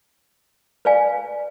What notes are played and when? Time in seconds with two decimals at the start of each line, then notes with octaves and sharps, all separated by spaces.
0.85 B4 D5 F5 G#5